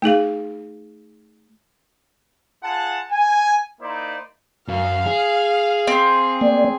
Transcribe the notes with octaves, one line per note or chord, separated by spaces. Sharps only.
A3 D#4 G#4 F5
F4 G#4 F#5 A5
G#5
A#3 D#4 E4 C5 D5
F#2 F5
G#4
C4
A#3 D5